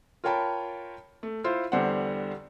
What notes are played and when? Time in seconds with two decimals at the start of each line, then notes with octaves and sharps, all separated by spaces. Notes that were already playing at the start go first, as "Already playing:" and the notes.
0.24 F4 A#4 C#5 G5 A5 B5
1.23 A3
1.44 E4 F4 C5
1.72 E2 D3 G3 C5 F#5